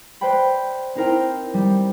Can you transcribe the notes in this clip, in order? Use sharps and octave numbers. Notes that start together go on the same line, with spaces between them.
B4 C5 D5 G5 B5
C4 D#4 E4 A#4 C5 G5
G3